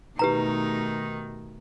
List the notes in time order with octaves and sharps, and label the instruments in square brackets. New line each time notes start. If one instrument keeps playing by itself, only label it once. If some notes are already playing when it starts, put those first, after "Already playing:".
[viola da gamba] B2 A3 D#4 [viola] D#3 [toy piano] G4 B4 A#5